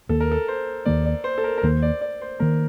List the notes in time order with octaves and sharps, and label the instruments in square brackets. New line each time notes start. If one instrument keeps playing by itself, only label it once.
[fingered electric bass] D#2 D#3 A#3 [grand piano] A4
[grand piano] A#4
A4
C5
[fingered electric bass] D#2 D#3 A#3 [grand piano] D5
[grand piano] D5
C5
A4
A#4
A#4
[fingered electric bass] D#2 D#3 A#3 [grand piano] C5
[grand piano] D5
D5
C5
[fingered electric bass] D#3 A#3 [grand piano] A#4